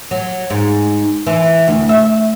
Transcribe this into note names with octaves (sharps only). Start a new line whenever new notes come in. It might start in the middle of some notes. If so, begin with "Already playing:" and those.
F#3
G#2
E3
D2
E5